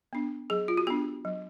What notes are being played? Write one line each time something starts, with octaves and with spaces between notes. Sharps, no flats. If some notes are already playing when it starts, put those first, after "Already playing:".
B3 D4
F#3 G#4
F4
F#4
B3 D4 G4
F#3